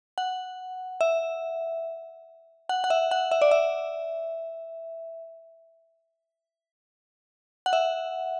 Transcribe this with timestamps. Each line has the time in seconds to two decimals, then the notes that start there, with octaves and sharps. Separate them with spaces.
0.18 F#5
1.01 E5
2.69 F#5
2.84 F#5
2.90 E5
3.11 F#5
3.31 E5
3.42 D5
3.51 E5
7.66 F#5
7.73 E5